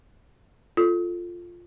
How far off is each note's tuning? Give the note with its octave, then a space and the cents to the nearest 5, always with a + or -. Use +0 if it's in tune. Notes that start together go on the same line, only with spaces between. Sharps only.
F4 +0 A4 +0